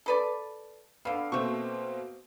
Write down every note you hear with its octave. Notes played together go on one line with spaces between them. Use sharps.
A4 B4 D5
D3 B3 F5
B2 A3 A#3 C4 C#6